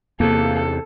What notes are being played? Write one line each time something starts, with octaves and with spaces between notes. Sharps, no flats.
E2 C3 A#3 A4